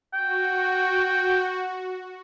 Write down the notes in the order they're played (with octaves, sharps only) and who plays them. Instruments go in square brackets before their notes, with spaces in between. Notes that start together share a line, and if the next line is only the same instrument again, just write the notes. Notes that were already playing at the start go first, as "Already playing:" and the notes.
[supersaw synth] F#4 [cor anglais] G5